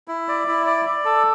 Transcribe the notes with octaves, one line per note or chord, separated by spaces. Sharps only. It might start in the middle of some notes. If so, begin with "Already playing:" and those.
E4
D5
E4
D5
D5
A4